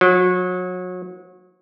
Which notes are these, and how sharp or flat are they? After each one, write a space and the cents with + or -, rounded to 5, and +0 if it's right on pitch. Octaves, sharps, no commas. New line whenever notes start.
F#3 -30